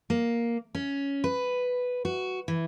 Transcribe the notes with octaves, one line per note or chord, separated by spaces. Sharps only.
A#3
C#4
B4
F#4
E3